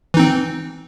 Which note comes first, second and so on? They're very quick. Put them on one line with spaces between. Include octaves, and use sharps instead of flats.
E3 D#4 C4